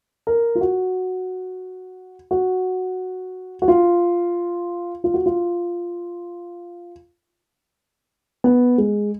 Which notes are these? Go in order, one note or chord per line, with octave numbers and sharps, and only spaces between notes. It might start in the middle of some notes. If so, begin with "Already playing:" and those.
A#4
F4
F#4
F#4
F#4
F4
F4
F#4
F4
B3
G#3